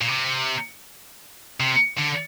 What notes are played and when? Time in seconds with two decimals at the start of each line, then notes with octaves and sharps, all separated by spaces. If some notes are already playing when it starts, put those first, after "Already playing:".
0.01 A#2
0.08 C3
1.60 C3
1.99 D3